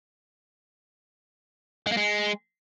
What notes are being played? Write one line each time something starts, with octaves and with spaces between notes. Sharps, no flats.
G#3
A#3
G#3